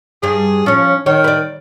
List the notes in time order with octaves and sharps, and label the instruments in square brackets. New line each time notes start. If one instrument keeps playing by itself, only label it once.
[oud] G2 G3 [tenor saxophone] G#4
[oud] F3 C#5 [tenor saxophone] C#4
[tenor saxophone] D#3 [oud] C#5
[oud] B4 D5